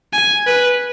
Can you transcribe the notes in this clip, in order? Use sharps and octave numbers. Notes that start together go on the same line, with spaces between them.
G#5
B4